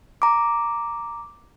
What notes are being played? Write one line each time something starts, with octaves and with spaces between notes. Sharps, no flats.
A#5 D6